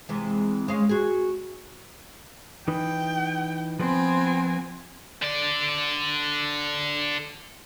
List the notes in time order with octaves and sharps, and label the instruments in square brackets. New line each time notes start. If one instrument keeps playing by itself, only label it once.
[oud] C3 E3 G#3
G#3 C#4 F5
F#4 G#4
[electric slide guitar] E3 D#4 B4 [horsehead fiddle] G5
[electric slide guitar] F3 B4 [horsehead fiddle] B3 G#5 [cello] C4
[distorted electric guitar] D3 D5